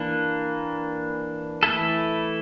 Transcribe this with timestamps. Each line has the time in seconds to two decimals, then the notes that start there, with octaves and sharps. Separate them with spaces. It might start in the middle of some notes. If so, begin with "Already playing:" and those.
Already playing: E3 A#3 D4
1.63 E3 A3 E4 A4